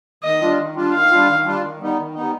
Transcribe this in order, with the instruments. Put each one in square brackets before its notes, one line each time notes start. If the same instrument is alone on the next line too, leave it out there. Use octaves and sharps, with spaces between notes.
[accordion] D#3 [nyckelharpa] D#5
[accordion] G3 D4 F4
D#3
G3 D4 F4
[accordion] D#3 [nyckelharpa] F5
[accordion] G3 D4 F4
D#3
G3 D4 F4
D#3
G3 B3 D#4
D#3
G3 B3 D#4